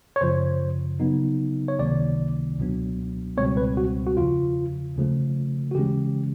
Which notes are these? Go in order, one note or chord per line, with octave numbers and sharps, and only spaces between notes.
C#5
F#2 C#3 F3 C5
C#3 F#3 B3 D#4
C#5
C#2 C3 D#3 F#3 A#3 D5
C#2 B2 F#3 B3 D4
C#2 B2 G3 C4 C#5
B4
F#4
F#4
E2 C#3 F3 F4
D#2 C#3 F3 A3
F#4
C#3 E3 G#3 C#4 G4